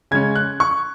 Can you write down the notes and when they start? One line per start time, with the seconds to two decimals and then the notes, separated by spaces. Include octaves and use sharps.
0.11 C#3 G#3 C#4 G#6
0.36 F#6
0.60 C#6